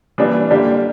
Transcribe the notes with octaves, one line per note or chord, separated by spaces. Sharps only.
E3 G3 A#3 D4
D3 G3 A#3 D4 G4